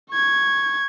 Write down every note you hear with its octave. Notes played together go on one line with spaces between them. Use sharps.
C#6 G#6